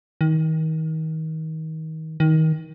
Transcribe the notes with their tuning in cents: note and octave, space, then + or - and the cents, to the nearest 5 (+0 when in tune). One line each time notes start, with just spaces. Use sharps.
D#3 +30
D#3 +25